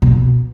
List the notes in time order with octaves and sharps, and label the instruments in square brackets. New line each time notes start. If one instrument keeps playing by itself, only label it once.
[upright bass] B2